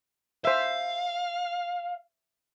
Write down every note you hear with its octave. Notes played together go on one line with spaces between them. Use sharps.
C5 E5 F5